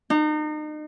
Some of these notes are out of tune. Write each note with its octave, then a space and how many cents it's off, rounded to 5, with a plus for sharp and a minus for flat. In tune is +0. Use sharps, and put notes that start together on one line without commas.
D#4 -35